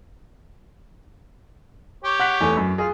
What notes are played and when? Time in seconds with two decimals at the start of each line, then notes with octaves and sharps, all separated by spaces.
2.04 G4 C#5
2.20 F#5 F#6 B6
2.41 E2 A3 G#5
2.57 F#2
2.78 F4 G#4